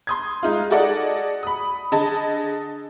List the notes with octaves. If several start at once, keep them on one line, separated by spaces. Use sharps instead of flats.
C6 D#6 G#6
G#3 D#4 F4
F#4 G#4 A4 D5 D#5 F#5
B5 D#6
D3 G#4 D#5 A5